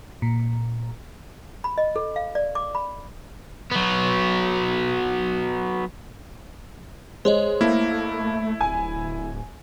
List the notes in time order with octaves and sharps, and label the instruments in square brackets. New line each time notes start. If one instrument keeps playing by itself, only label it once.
[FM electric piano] A#2
[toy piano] B5
D#5
A4
F5
D5
D6
B5
[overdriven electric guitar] F#3 B3
[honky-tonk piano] G#3 [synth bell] C5 C#5 D#5
[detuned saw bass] A3 [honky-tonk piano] A#3 [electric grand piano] E4
[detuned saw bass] D1 [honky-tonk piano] G#5